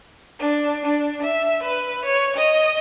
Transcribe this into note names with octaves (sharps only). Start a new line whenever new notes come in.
D4
D4
E5
B4
C#5
D#5